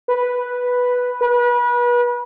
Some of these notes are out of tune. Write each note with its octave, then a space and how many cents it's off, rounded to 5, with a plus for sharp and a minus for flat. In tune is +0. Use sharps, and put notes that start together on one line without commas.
B4 -5
B4 -35